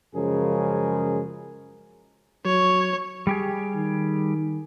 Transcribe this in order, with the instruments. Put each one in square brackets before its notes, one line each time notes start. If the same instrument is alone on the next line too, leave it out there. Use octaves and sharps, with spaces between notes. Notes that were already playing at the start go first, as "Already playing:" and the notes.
[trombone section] F#2 C#3 F3 G#3 G#4 A#4
[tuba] F#3 [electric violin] C#5
[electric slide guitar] G3 G4 G#4
[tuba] D#3